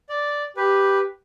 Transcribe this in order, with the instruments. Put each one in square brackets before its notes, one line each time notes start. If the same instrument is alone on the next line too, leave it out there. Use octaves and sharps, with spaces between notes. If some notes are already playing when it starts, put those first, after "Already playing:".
[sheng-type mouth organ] D5
[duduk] G4 [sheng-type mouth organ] B4